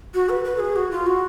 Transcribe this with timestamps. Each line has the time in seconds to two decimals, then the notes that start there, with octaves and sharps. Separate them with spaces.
0.14 F#4
0.29 B4
0.45 B4
0.56 A4
0.60 G#4
0.76 F#4
0.91 F4
1.06 F#4